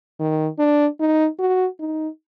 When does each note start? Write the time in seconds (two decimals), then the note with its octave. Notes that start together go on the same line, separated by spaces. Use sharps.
0.19 D#3
0.59 D4
1.00 D#4
1.39 F#4
1.80 D#4